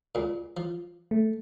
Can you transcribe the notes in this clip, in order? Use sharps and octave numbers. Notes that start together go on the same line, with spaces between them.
C#2 A#2
F3
A3